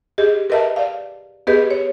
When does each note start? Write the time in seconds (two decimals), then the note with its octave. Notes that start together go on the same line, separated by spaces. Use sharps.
0.18 G4 G#4 D#5
0.50 A#4 B4 D#5 E5 A5
0.76 D5 F5
1.47 B3 G4 G#4 B4 D#5
1.71 C#5